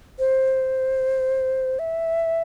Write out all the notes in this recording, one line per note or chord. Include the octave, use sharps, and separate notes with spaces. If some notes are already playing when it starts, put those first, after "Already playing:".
C5
E5